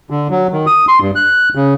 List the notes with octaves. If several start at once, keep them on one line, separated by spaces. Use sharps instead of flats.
D3
F#3
D#3
D#6
C6
G2
F#6
C#3